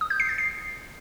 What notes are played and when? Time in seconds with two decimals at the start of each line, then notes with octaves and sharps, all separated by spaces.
0.01 D#6
0.10 G6
0.20 C7
0.29 A6
0.38 C7